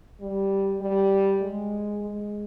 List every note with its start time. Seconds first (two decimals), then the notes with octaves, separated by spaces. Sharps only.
0.21 G3
0.81 G3
1.42 G#3
2.02 G#3